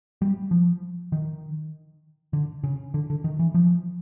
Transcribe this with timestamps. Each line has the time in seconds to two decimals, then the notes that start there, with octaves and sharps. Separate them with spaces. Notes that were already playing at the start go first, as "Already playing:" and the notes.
0.22 G3
0.51 F3
1.12 D#3
2.33 D3
2.64 C#3
2.94 D3
3.10 D3
3.24 D#3
3.39 E3
3.54 F3